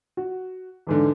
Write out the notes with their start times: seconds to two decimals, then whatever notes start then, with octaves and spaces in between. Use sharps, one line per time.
0.17 F#4
0.87 E2 G#2 D3